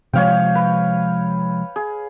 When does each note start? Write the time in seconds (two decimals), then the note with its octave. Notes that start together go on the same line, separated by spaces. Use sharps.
0.13 C3 F3 G#3 C#5 F5 G5
0.55 B4
1.76 G#4